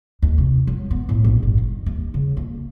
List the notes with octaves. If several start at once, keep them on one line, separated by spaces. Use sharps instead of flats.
D#2
C3
F#3
B3
A2
A#1
G1
D#3
D#2
C#3
A#3